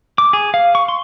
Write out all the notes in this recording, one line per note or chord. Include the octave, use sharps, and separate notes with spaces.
D6
G#4
F5
C#6
C6